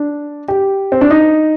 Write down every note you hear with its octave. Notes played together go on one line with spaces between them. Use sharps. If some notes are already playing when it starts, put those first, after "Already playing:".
Already playing: D4
G4
C4
D4
D#4